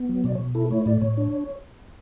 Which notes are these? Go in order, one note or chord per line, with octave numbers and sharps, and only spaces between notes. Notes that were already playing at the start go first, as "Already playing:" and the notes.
Already playing: B3
F#3
B2 D5
C#5
B2
E4 A4
A3 C#5
A2 D5
A2 C#5
D4